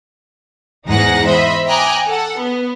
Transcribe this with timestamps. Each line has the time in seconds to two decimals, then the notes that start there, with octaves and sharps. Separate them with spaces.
0.86 E2 G#2 D#4 G#4 F#5 A#6
1.25 C5 D#5 E5 B5
1.68 G5 G#5 A#5 D6 D#6 F#6
2.06 A4 F#5
2.38 B3